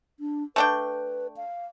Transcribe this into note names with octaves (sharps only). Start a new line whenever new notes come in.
D4
A3 D4 B4 G5
F5